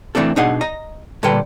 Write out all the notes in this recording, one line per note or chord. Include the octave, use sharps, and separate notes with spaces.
E3 A3 C4 D4 A4
B2 D4 D#4 G#4 D#5 F#5
D#5 A#5
A#2 D3 G3 A4 B4 G5